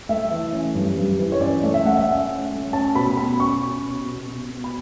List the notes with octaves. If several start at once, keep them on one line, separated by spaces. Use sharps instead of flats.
A3 E5
E3
C#4
G2
G2
E3
C#5
C#4 D5
A3
E5
A3 F#5
E5
C#4
C#4
A3
C#4 A5
B2 B5
B2 B5
C#4 C#6
C#4
B2
B2
B2
B2
B5